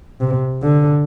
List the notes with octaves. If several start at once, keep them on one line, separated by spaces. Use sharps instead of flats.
C3
D3